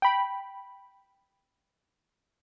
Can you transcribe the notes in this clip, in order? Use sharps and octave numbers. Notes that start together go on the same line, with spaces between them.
G5 B5